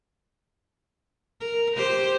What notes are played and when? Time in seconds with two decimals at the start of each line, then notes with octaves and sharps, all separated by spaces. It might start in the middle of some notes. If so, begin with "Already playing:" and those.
1.40 A#4
1.76 G4 C5